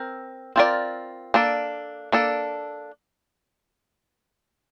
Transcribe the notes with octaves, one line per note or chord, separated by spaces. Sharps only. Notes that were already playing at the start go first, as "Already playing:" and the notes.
Already playing: C4 A#4
C4 F4 A#4 D5
A#3 D4 A4
A#3 D4 A4